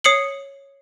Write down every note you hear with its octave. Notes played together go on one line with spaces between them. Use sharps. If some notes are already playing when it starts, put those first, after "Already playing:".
C#5 D#6 C7 C#7 F#7